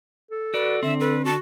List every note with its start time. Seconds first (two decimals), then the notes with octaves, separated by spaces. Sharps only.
0.31 A4
0.54 F#4 B4 D5
0.83 D3 C4 E5
1.00 A4 B4
1.25 F#4 A5